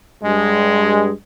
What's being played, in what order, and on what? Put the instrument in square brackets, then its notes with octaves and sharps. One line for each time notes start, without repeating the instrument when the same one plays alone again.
[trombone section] G2 G#3